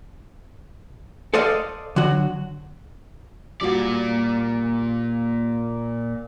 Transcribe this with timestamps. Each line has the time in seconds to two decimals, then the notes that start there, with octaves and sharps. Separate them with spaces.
1.34 A4 C5 D5 D#5 F5
1.96 D3 F#3 F#4
3.61 A#2 G3 F4 F#4 D5